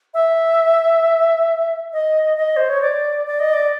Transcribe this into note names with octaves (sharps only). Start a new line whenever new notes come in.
E5
D#5
D#5
C5
C#5
D5
D5
D#5
D5